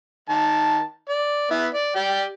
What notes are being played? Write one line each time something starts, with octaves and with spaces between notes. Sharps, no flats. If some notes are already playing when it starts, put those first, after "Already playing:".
D#3 A5
D5
B3 E4
D5
G4 D5 G5